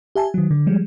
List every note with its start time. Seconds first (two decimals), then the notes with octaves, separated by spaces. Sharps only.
0.15 G4 E5 G#5 A5
0.34 D#3 F#3
0.51 D3
0.66 F3 G3 G#3